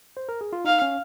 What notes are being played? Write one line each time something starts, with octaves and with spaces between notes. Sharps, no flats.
C5
A#4
G#4
F4
D#4 F5
C#4